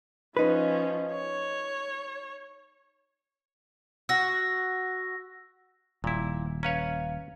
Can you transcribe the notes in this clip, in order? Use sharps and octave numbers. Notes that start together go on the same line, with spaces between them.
F3 C#4 D#4 B4
C#5
F#4 E6 A#6
D#1 A#2 E4
C#4 B4 C#5 F5 A#5